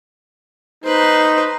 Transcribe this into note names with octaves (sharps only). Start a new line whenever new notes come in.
D#4 B4 C5